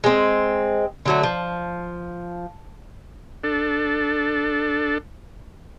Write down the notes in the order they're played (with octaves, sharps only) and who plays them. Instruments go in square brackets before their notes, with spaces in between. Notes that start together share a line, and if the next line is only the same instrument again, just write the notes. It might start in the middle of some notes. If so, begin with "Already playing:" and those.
[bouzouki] G#3 C4
D3 F#3 A3
F3
[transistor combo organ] D4 A4